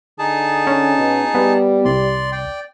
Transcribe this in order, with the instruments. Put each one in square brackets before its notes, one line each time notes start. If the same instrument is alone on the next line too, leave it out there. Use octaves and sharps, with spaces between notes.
[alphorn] D3 [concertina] D#4 G#4 A5
[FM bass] C#4
[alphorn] B2
[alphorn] G3 [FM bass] B3
[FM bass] C2 [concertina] D5 C6
[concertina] D5 G5